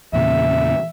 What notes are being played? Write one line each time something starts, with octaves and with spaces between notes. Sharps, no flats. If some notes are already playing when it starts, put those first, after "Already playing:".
E2 A#2 C#3 E5